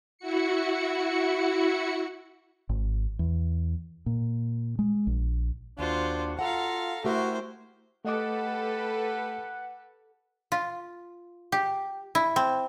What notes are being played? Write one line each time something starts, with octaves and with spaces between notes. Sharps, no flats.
E4 F#4 C#7
G#1
E2
A#2
G#3
A#1
D#2 D4 F4 F#4 C5
F4 A4 F5 F#5 A#5
A3 E4 F#4 G4 A#4 C5
A3 G4 A4 B4 D#5 F#5 D6
F4
G4
E4
C4